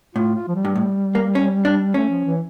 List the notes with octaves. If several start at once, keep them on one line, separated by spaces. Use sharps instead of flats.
A2 F4
F4
F3
G3
G2
A2
A#3
C#4
D4
A3 C#4
F3
E3